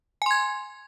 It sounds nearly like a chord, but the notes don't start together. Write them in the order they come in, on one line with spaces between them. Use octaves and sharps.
G#5 C6 G#6